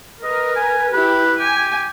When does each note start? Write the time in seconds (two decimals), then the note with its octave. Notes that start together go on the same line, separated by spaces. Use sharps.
0.24 A#4 B4 D#5
0.56 G#5
0.93 E4 G4 B4
1.40 G4 G#5